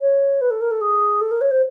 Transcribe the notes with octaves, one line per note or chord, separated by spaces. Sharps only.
C#5
B4
A4
A#4
A4
G#4
A4
A#4
C#5
C5